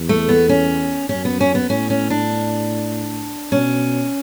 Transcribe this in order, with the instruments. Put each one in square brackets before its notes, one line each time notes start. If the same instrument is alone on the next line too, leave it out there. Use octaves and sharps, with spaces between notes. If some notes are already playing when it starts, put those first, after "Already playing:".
Already playing: [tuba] E2
[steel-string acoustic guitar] A3
B3
C#4
[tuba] F#2 [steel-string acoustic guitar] C#4
[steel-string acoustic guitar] B3
C#4
B3
[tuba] A2 [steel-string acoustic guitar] C#4
[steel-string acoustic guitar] C#4
D4
[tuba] B2 [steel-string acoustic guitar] C#4